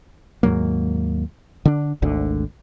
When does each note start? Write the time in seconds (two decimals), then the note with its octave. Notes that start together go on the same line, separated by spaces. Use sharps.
0.43 D#2 G#2 F#3 A#3
1.65 D3 D4
2.02 G#1 D2 D3